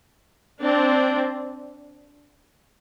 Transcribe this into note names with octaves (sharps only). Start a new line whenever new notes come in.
C4 D4